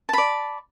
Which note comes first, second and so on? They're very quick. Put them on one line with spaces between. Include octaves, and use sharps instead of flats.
A5 B5 D5